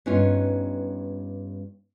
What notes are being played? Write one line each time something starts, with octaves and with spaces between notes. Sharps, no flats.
G2 B3 C#4 D#4 F4